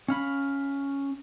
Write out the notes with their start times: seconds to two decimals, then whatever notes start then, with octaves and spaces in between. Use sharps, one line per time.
0.08 C#4 F5 B5